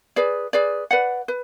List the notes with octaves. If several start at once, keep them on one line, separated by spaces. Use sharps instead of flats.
G#4 B4 D5
G#4 B4 D5
B4 D5 F#5
B4